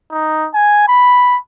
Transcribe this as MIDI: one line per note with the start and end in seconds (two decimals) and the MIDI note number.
0.11 0.48 63
0.54 0.86 80
0.88 1.37 83